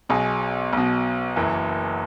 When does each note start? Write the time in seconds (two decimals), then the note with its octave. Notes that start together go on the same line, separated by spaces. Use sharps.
0.09 B1 B2 G#4
0.73 B1 B2
1.36 F#1 F#2 E3